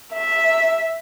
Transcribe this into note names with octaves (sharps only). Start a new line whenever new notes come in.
E5